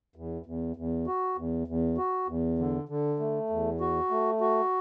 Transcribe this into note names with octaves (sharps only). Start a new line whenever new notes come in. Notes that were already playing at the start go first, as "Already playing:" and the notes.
E2
E2
E2
F#4
E2
E2
F#4
E2
D3
D3
A3
E2
F#4
A3
F#4